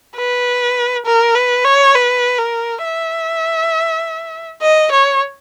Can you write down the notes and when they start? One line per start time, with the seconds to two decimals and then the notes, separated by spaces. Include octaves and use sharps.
0.16 B4
1.05 A#4
1.35 B4
1.64 C#5
1.95 B4
2.38 A#4
2.84 E5
4.62 D#5
4.91 C#5